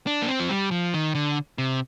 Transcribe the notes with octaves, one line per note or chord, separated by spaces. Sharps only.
D4
A#3
C4
F3
G3
F3
D#3
D3
C3